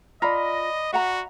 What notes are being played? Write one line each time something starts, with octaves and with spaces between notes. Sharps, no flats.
F4 D5 D#5 A#5 B5 A#6
F#4 E5 F#5 A#5